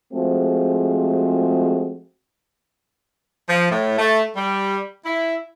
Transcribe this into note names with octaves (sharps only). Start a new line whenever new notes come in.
F3 G#3 A3 C4 F#4 G#4
F3
A2
A3
G3
E4